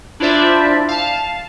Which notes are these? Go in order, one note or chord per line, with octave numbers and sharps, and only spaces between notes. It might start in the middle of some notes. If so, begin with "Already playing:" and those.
D4 E4 F4 C5 D5 E5
F5 A5